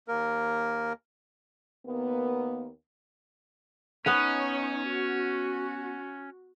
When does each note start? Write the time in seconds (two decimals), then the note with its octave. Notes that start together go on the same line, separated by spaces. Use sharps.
0.08 D#2 A#3 A#4
1.85 D#2 A#3 B3
4.06 B3 C#4 D#4 B4 C#5 F#5
4.88 F#4